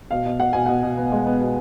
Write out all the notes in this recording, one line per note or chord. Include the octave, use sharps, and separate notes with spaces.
B2 F5
B2
B2 F#5
B2 G#5
B2 F#5
B2
B3
G#3
B3
B2